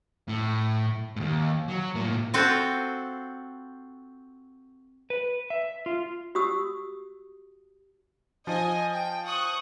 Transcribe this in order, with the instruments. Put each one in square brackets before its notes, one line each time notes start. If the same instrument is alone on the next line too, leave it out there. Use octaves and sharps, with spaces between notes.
[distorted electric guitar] A2
D#2 G#2
F#3
A2 A#3
[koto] C4 F4 F#4 A4 C5 F5
[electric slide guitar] B4
E5
F4
[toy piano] F#4 G4 D#6 E6
[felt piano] F3 [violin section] D#5 G#5
[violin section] G5
C#6 D#6 F#6